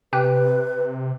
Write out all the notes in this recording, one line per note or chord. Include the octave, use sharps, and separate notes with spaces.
C3 G4 B4 G5 F#6